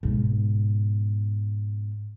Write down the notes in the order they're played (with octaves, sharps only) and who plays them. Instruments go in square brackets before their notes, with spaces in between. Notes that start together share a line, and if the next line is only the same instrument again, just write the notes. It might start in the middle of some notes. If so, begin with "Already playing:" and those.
[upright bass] G#2 B2